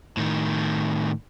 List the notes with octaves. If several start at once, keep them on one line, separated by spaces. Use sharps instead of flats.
A2 D#3